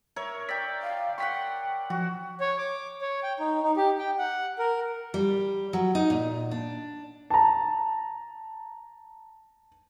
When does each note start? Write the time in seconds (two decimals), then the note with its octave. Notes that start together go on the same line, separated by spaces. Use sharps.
0.16 A#4 C#5 E5
0.49 D5 G5 E6 B6
0.82 F5
1.18 F#5 G5 C6 C#6 B6
1.90 F3 F#4
2.40 C#5
2.58 D6
3.01 C#5
3.23 G5
3.40 D#4
3.63 D#4
3.76 G4
3.99 G5
4.18 F#5
4.59 A#4
5.14 G3
5.73 F#3
5.95 D#4
6.10 A#2
6.51 D4
7.30 A5 A#5